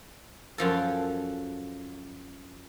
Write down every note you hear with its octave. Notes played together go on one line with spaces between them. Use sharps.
F#2 F3 A4